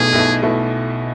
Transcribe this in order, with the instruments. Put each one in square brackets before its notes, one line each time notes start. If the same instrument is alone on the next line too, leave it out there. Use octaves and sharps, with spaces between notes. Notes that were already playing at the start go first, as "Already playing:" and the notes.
Already playing: [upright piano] B1 B2 A3 E4 [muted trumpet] G#4
[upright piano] B1 B2 A3 E4
B2 A3 E4